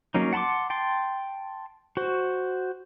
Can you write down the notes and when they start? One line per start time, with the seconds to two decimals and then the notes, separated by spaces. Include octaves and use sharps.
0.14 F#3 A#3 C#4 D#4
0.33 F#5 A5 B5 C6 D6
0.70 G5 A5 C6
1.97 F#4 C5